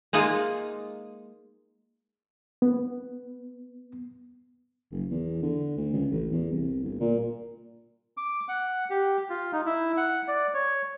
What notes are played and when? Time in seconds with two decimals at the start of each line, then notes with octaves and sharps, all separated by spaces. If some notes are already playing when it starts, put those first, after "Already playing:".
0.13 G#3 A#3 D#4 F4 D#5
2.62 B3
4.92 F#1
5.11 E2
5.43 D3
5.77 D2
5.93 C#2
6.12 A1
6.31 E2
6.52 C2
6.84 G1
7.00 A#2
8.17 D6
8.48 F#5
8.90 G4
9.30 F4
9.53 D#4
9.66 E4
9.97 F#5
10.28 D5
10.54 C#5